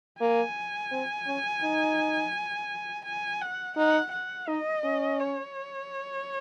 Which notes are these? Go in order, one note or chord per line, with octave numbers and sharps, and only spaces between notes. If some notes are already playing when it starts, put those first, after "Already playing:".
A#3 G#5
C4
C#4
D#4
G#5
F#5
D#4 F#5
F#5
D#4 D#5
C#4
C#5